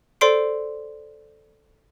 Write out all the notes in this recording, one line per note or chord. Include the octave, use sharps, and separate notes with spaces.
A4 C5 D5 C6 C7 D7